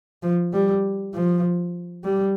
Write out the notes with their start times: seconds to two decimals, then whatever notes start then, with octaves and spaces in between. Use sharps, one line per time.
0.23 F3
0.53 G3
1.14 F3
2.04 G3